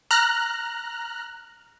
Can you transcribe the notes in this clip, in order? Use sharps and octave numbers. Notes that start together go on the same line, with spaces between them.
A#5 F6 F#6